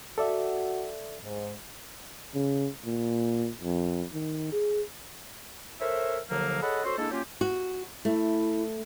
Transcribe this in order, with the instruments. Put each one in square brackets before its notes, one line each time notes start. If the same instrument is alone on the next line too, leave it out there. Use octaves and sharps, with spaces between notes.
[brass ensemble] F#4 [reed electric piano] A4 D5 E5
[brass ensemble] G#2
[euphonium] C#3
A#2
F2
D#3
G#4
[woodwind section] A4 A#4 C5 C#5 E5
D#2 D3 F3 F#3 A#3
G#4 A4 C#5 D#5 F#5 B5
C#4 F#4 A4 C5
G#3 A#3 D4 E4 A4
F#3 A#3 C#4 F4 G4
[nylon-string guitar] F#4
[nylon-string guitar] A3 [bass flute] E4